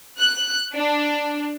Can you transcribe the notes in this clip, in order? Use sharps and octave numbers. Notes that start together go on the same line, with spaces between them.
F#6
D4